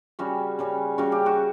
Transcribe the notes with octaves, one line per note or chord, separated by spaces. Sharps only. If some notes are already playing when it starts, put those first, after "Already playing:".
C#3 G3 C#4 F#4
C#3 G3 C#4
C#3 G3 C#4 F#4
G4
F#4